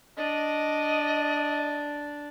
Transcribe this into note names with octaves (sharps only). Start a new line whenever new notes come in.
D4 D5 D#5